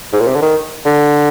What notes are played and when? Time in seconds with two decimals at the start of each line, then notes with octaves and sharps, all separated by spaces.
0.13 G#2
0.20 A#2
0.27 C3
0.35 D3
0.42 D#3
0.85 D3